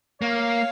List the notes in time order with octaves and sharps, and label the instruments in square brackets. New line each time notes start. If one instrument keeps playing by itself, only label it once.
[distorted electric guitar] A#3 [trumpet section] C#5 F5